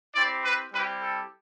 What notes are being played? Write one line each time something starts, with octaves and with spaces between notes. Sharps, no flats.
C4 E4 G4 D5
B4
G3 C4 E4 G4 B4
A4